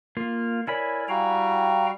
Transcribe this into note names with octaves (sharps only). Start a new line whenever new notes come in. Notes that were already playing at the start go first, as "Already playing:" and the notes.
A#3 F4
E4 A#4 C#5 D5 G#5 B5
G3 F#4 F5 G5 A#5